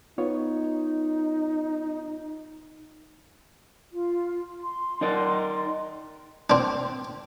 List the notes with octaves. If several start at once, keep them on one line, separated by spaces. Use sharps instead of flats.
B3 D#4 F4 C#5
F4
C6
D#4 A#4 D5
C4 D4